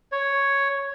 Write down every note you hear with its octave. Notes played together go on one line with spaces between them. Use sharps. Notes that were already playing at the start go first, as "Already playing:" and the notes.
C#5